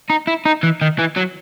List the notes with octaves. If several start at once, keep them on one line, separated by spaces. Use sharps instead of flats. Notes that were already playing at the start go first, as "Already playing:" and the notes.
D#4
E4
D#4
E3
D#3
E3
F#3